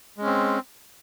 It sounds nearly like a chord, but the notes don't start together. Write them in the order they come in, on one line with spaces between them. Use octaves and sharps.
G#3 C#4 C4